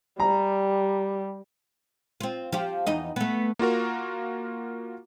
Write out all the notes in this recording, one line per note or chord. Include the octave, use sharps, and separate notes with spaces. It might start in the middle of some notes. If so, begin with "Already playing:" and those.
G3 A#5
C4 F4
F3 F4 G4
E2 D#4 D#5
A3 B3
A#3 F4 F#4 A#4